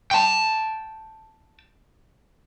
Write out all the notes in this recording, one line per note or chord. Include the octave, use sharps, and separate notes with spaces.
G5 A5